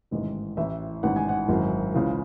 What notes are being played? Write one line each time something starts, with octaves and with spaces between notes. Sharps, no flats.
A1 G#2 D#3 D#5
A1 A2 E3 E5
A1 G#2 D#3 F#5
G#5
F#5
G#1 F#2 E3
C#2 C#3 E3